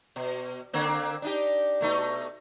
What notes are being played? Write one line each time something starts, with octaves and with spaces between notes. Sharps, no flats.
B2
D3 A#3 C4
D4 D#4 G4
B2 A3 D#4